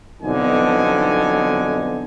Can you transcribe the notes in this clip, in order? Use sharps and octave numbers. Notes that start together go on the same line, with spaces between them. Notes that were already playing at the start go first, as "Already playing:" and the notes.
B1 F2 B2 D3 D#4 G#5